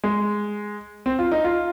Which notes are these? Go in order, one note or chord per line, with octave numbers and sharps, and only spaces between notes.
G#3
C4
F4
D#4
F4